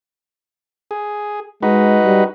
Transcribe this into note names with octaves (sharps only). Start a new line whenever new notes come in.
G#4
G#3 D#4 F#4 B4
G3